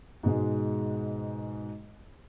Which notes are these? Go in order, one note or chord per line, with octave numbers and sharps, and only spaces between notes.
G#2 B2 G#3